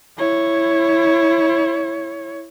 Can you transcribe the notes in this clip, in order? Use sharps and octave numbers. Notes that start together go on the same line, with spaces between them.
E4 C#5